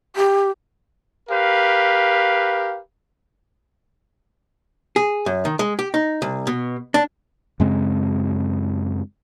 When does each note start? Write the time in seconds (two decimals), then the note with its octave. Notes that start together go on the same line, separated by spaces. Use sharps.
0.16 G4
1.30 G4 A#4 B4 F5
4.96 G#4
5.26 F#2
5.45 D#3
5.59 G#3
5.79 G4
5.94 D#4
6.22 C2
6.47 B2
6.94 D4
7.60 F#2 C#3 G#3 C4